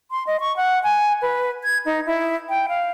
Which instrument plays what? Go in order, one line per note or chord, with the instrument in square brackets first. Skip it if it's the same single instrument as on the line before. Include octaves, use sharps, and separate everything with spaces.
[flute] C6
D#5
C#6
F#5
G#5
B4
G#6
D#4
E4
G5
F5